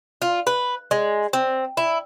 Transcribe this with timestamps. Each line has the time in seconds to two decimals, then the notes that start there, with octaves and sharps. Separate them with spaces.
0.22 F4
0.47 B4
0.91 G#3
1.33 C4
1.77 E4